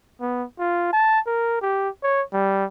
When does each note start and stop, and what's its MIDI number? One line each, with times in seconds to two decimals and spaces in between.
0.21 0.44 59
0.59 0.91 65
0.93 1.20 81
1.26 1.61 70
1.62 1.89 67
2.03 2.22 73
2.33 2.65 55